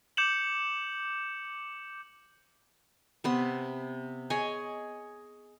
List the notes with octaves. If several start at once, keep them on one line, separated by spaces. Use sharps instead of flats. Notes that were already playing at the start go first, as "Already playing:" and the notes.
D6 G6 C#7 E7 F#7
C3 B3 C6
G#4 C#5 D#5 G#5